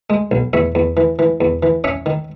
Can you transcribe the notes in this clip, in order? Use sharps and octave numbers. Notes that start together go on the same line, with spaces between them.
G#3
B1
E2 C#5 E5
E2
E3
E3
E2
E3
C#4 C#5 E5
D#3